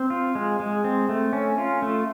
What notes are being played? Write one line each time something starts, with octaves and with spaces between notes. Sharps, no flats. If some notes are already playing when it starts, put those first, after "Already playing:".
Already playing: C4
F4
G#3
G#3
C4
A3
C#4
F4
A3